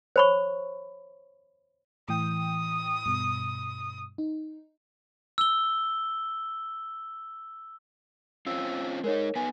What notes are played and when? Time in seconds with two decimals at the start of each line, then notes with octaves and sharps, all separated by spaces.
0.16 C5 C#5 B5 C#6
2.09 A2 E3 G5 D#6
3.06 G2 B2
4.18 D#4
5.38 E6 G7
8.46 C4 C#4 F4 E6
9.04 G#3 D#4 A#4 C#5
9.36 B3 D#4 B4 G#5